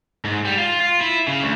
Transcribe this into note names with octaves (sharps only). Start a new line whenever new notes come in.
G#2
G3
F4
F4
E4
C#3
D2